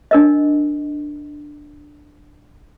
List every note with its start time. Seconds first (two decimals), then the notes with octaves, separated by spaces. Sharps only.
0.11 D4 A#4 D#5